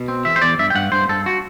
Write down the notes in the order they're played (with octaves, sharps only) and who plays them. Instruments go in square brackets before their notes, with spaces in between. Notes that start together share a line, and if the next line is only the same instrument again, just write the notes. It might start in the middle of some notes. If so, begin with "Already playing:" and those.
Already playing: [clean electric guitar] B2
C4
E2 E5
C5
E2 D5
G2 E5
G5
G2 F#5
G2 C5
G2 A4
F#4